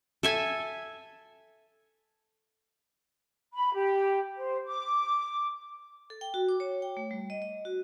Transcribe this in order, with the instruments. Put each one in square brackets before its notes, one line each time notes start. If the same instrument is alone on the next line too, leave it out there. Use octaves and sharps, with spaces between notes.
[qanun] A4 E5 G#5
[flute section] B5
G4
C5
D6
[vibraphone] A4
G5
F#4
D6
C#5
G5
A3
G3
D#5
D#5
F#4